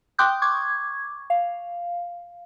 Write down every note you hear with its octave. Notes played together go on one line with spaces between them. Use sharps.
G5 C6 D6 D#6 F#6 G6
C#6 D6 G#6
F5